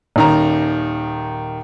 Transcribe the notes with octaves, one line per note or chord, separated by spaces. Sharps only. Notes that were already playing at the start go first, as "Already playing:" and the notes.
D#1 D#3 A#5